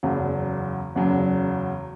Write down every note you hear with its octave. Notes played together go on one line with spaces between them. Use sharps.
F#1 E2 C#3 F#3
F#1 E2 C#3 F#3